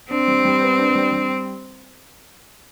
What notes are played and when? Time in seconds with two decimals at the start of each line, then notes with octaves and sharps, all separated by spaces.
0.11 C4 D4
0.28 G3
0.45 G3
0.62 B3
0.78 D4
0.95 G3
1.12 G3